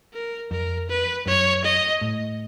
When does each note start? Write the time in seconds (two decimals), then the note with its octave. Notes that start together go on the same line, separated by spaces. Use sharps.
0.13 A#4
0.51 F2 A#4
0.89 B4
1.26 F#2 C#5
1.64 D#5
2.01 A2